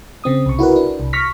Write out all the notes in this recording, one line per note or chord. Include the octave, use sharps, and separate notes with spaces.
C#3 C4 D#6
C2 C#6
E4 F#4 A#4 B4
D4
C2
C#6 F6 A#6 B6